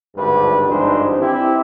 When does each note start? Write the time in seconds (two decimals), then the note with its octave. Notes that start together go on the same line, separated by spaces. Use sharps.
0.16 G#1 D2 G2 D3 G4 B4
0.68 G#1 G2 E3 D4 D#4 C5
1.19 C4 E4 G4